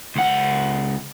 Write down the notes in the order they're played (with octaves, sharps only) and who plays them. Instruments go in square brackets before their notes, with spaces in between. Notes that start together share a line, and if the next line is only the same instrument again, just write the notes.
[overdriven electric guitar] C#2 F#5